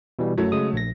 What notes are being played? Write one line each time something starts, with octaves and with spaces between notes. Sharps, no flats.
B2 E3 G3
F#2 F#3 A3
C#3 G#3 D#6
A#1 A#6